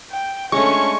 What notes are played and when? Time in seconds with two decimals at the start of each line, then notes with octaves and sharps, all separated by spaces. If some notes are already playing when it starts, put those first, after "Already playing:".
0.10 G5
0.52 G#3 A3 C#4 D4 C#6